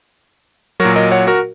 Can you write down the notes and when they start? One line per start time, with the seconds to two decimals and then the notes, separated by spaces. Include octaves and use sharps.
0.80 F#3 F#4 A#4
0.85 A#2
0.96 A#4 D#5
1.12 C#5 F#5
1.27 F#4 A#4